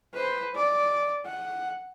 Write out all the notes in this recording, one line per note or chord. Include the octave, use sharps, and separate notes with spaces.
B4 C5
D5
F#5